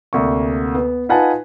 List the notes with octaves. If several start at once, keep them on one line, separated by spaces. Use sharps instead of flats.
D2 C3 A#3 C#6
B3
D#4 F4 B4 F#5 G#5 A5